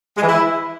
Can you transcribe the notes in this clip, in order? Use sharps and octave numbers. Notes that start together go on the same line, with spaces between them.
G#3
E3
E4